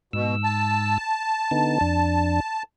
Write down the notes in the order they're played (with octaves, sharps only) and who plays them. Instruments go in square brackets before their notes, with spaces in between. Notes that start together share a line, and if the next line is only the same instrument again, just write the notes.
[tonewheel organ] G#2 E6 [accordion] B2
[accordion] A5
[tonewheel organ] D3 B3 D#4
F2 D4